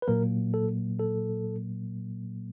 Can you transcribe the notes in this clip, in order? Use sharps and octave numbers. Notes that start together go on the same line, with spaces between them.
B4
A#2 F#3 A#3 A#4
A4
A4